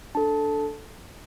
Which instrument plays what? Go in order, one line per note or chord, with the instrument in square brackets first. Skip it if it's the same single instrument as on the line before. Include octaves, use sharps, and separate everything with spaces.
[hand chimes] D4 A4 A5